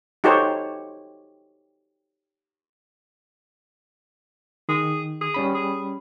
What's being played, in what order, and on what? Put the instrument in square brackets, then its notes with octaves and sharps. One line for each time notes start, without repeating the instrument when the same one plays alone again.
[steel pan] D#4 F#4 G4 A4 C5 C#5
[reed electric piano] D#3 [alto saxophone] G#4
[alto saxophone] G#4
[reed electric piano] G3 C#4 B5
[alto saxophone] G#4